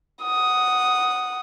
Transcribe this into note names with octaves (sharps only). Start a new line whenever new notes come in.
F#5 D#6